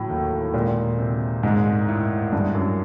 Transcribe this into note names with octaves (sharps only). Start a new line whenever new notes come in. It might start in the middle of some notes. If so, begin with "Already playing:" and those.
Already playing: A2 E3 F#3
D#2
A#2 G#3
C3
G#2 G#3
A2
G2 G#3
F#2